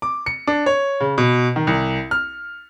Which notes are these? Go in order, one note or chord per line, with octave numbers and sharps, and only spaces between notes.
D6
C#7
D4
C#5
C#3
B2
D#3
C2
F6